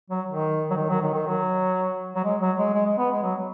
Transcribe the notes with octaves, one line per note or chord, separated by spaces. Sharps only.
F#3
D#3
F#3
D#3
F#3
D#3
D#3
F#3
F#3
G#3
F#3
G#3
G#3
G#3
B3
G#3
F#3